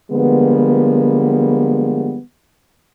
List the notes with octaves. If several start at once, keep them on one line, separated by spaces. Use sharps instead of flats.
D3 F3 G3 G#3 A#3 B3